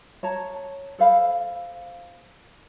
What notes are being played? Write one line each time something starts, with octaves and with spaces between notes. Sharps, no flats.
C#5 A5 A#5
A4 C5 F5 B5